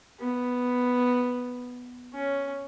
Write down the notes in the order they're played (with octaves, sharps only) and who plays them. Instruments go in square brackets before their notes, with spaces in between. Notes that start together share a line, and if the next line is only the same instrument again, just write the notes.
[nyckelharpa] B3
C#4